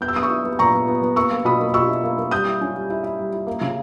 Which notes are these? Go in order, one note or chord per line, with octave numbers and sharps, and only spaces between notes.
B3 G6
E6
B3 D#6
C#6 E6
E4
B3
A#2 A#5 C#6
B3
B3
B3
A#3 C#6 E6
A#3
B2 B5 D#6
A#3
B2 C#6 E6
E4
A#3
A#3
G3 D#6 G6
E4
C#4
G3
E4
E4
G3
E4
A#3
C#3